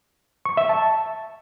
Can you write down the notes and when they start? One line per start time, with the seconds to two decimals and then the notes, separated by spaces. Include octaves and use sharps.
0.45 C#6
0.57 E5
0.69 A5